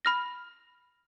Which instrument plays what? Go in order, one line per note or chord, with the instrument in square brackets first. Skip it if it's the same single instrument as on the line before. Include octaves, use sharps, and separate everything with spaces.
[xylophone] B5 F6 A#6